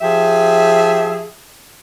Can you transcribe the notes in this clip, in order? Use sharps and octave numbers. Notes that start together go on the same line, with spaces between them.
F3 G4 G#4 E5